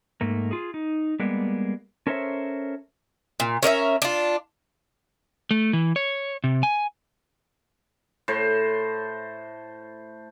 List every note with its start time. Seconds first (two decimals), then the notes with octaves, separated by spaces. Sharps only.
0.21 G#2 A3 A#3
0.51 F4 G#4
0.74 D#4
1.19 G3 G#3 A#3 B3
2.07 C#4 A4 A#4 C5 C#5 E5
3.40 A#2
3.63 C#4 A#4 D5 E5
4.02 D4 F4
5.51 A3
5.73 E3
5.96 C#5
6.44 C3
6.63 G#5
8.28 A2 C5